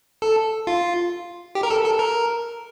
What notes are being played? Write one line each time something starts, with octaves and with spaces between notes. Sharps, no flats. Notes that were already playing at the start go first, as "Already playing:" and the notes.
A4
F4
G4
A#4
A4
A4
A#4